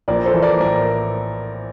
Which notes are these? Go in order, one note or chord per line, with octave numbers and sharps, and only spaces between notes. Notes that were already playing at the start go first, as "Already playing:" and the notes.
A#1 A#4 D5
A4 C5
E3
A#4 D5
A2 A#4 D5